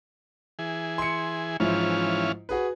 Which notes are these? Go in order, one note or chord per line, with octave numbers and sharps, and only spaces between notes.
E3 G#4
C6 C#7
G#2 E3 F3 C#4 E4 F4
F#4 G#4 B4